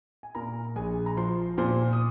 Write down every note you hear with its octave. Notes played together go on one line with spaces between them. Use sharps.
G#5
A#2 A#4 A#5
A#1 G#4 G#5
A#5
F3 C5 C6
A#2 C5 C6
D#6